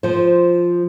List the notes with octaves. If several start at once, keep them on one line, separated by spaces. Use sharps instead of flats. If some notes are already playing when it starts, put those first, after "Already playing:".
F3 C5